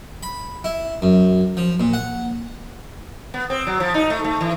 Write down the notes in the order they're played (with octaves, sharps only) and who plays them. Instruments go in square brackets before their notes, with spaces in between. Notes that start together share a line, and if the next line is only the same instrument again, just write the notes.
[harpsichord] B5
E4
F#2
F3
A#2
F#5
[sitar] B3
C4
F#3
F3
D#4
A3
A3
E3